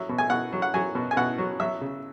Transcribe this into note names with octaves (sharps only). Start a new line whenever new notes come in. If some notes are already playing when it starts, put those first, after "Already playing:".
Already playing: F#3 E5
B2
G#5
B2 F#5
F#3
F#5
F#3 G#5
B2
G#5
B2 F#5
F#3
F#3 E5
C#3